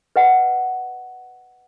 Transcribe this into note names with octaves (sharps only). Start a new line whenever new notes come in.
B4 D#5 F#5